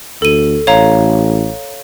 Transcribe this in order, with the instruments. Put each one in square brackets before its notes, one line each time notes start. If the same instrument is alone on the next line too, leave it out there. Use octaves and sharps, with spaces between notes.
[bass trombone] D2 [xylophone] A4 D#7
[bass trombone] A1 [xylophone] C#5 F5 A#5